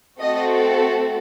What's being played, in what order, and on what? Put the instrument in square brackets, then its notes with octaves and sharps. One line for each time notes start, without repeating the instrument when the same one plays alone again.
[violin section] A3 C4 F#4 A4 D#5